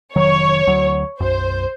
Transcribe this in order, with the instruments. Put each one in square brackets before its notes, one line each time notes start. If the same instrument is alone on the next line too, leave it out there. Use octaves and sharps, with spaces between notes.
[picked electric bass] F1 D#3 F#3 [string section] C#5
[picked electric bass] D2 F#3
[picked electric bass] B1 F#2 [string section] C5